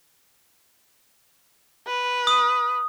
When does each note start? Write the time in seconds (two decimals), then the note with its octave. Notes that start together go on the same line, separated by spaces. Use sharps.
1.87 B4
2.27 D#6